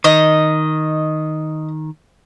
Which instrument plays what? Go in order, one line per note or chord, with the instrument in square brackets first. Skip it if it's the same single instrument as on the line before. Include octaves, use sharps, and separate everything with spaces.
[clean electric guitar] D#3 [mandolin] D#5